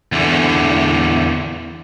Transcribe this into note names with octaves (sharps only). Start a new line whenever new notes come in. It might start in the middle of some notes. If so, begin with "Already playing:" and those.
E2 D3